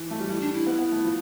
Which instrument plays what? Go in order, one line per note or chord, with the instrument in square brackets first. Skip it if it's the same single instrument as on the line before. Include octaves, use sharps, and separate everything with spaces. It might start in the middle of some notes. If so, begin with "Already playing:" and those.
Already playing: [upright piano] E3
A3
G3
[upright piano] A3 [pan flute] E4
[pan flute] D4
E4
[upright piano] B3
B3
A3
F3